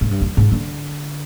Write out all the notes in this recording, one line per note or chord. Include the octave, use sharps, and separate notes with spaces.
G#2
G2
F2
G#2
D3